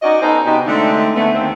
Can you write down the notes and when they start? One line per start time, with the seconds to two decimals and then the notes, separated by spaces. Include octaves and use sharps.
0.02 C#4 D#4 F#4 D5 D#5
0.21 B3 C#4 D#4 A4 B4 C5
0.46 C3 B3 D#4 F#4 G4
0.66 D3 G#3 A3 C4 D4 D#4
1.16 D3 A3 B3
1.35 D#2 C4